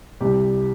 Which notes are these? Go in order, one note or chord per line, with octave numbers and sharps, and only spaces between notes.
C2 C3 G3 G4